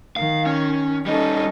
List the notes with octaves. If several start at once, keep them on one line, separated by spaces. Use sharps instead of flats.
D#3 F5
C#4
G3 C#4 D#4 A4 D#5